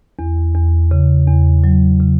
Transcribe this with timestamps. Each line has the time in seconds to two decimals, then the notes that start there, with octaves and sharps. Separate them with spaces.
0.19 E2
0.55 E2
0.91 C#3
1.27 E2
1.64 F#3
2.00 C#3